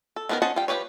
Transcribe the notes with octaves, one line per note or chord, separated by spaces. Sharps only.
A4
D#3 F3 B3 C#4 A#4
C#4 C5 D#5 F#5 A5
G3 F4 G5
F3 C#4 G4 B4 C#5